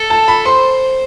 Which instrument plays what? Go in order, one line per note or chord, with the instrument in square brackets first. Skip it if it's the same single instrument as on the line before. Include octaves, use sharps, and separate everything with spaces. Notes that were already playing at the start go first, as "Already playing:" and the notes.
Already playing: [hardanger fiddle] A4
[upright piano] A5
B5
[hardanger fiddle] C5 [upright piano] C6